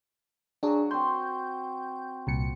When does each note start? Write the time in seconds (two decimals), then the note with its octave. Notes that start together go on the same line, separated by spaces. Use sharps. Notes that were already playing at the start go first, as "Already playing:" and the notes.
0.63 F#3 D4 F#4 G#4
0.91 C4 C6 G6
2.27 C2 A#2 C#7